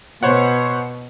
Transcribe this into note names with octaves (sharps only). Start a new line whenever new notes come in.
B2 C5 C#5 F#5